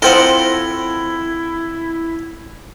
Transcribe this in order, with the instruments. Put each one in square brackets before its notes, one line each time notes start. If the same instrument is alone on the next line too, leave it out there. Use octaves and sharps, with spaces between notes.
[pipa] F3 C4 A#4 [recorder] E4 [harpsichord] A4 F#5